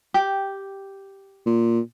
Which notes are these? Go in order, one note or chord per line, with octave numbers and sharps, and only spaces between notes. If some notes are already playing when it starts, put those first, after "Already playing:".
G4
A#2